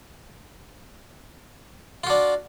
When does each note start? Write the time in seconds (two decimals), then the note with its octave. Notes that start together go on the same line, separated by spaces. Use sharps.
2.04 F4
2.07 F#4
2.10 D4